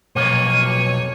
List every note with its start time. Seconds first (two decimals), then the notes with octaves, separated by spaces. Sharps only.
0.16 B1 F2 A#3 C#5 D#7